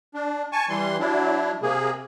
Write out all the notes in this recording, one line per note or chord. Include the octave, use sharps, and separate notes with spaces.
D4
G#5 A5 C#6
E3 G3 C6
F#3 D4 E4
C3 A#3 G#4